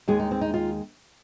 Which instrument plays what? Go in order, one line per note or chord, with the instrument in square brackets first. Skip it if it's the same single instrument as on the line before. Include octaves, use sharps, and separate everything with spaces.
[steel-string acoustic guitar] D#2 D#3 G#3 G#4
D#4
C4
D#4
F4